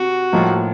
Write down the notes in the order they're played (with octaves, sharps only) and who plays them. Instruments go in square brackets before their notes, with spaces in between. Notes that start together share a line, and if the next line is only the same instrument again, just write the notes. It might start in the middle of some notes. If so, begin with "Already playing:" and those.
Already playing: [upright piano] C3 [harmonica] F#4
[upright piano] A2 F3 A#3 D#4